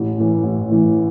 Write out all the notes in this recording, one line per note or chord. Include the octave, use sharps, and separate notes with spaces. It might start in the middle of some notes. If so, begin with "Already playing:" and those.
Already playing: A1
A2 E3
A1
A2 E3